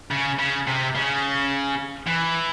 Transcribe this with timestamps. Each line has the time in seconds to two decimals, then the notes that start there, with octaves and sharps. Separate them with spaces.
0.11 C#3
0.39 C#3
0.67 C3
0.95 C#3
2.07 E3